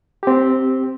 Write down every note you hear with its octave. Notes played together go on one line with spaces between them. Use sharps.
C4 G4